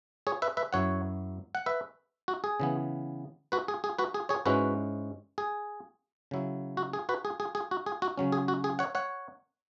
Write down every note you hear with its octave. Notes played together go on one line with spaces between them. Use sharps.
G#4 C#5
B4 E5
B4 E5
F#2 F#3 E4 C#5 F#5
F#5
B4 E5
F#4
G#4
C#3 E3 B3
F#4 B4
G#4
G#4
F#4 B4
G#4
G#4 C#5
G#2 G#3 C#4 E4 F#4 B4
G#4
C#3 F#3 E4
F#4
G#4
F#4 B4
G#4
G#4
G#4
F#4
G#4
F#4
C#3 F#3 C#4
G#4
F#4
G#4
C#5 F#5
C#5 F#5